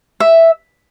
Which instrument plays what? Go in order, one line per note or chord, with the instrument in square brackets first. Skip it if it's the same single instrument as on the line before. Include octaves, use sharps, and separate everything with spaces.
[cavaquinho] E5